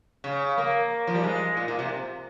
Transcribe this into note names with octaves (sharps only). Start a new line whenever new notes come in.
C#3
A#3
F3
G3
G#3
A#2
A#2
C3